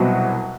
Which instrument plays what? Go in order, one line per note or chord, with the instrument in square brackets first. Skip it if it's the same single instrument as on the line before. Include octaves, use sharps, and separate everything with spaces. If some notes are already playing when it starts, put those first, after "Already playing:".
Already playing: [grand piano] C2 B2 F#3 C4 F#4